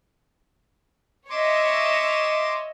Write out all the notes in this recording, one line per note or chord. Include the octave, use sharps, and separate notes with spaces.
C#5 D#5 E5 C6 D6